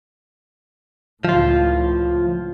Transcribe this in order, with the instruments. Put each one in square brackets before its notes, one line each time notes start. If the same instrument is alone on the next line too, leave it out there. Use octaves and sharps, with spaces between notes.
[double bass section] C#2 A2 [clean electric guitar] F3 F4